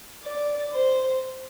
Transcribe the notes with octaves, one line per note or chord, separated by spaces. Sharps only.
D5
C5